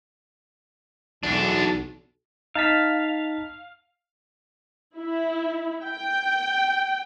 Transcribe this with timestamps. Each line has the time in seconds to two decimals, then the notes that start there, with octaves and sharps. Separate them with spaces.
1.23 B1 E2 D4
2.55 D#4 F5 A5 B6
4.96 E4
5.84 G5